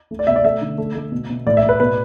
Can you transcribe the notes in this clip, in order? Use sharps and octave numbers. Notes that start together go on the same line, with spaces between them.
A3
D5
B2 E5
D5
A3 E5
D3
A3
A3
B2
B2
A2 D5
E5
A2
B4
B2 B4